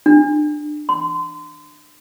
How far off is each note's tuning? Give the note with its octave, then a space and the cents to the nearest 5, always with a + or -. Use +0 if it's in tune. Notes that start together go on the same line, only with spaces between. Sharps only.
D4 +25
C6 -30